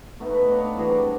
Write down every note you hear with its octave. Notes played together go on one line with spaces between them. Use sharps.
A3 B3 D#4
B4 D#5
D4 C#5 F5
E3 G3 F#4 G#4
C4 D4 A#4
B3 D4